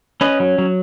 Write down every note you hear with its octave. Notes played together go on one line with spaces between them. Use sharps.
C#4 B4 D#5
F#3
F#3